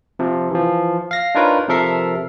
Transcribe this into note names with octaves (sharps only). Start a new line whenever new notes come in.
C3 F3
E3 F3
F5 A#6
D4 D#4 F4 A#4 B4 C#5
C3 F3 A4 A#4 E5 C7